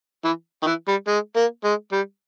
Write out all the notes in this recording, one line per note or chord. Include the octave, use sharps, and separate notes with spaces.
E3
D#3
E3
G3
G#3
A#3
G#3
G3